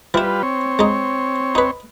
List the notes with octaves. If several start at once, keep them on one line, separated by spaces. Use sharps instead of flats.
E3 G3 E4 F4 B4
C4 C#5
G#3 D#4
D#4 B4